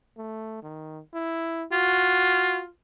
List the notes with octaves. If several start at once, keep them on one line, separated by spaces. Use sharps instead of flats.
A3
D#3
E4
F4 F#4